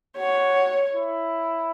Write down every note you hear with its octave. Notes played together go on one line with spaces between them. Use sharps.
F#4 C#5
E4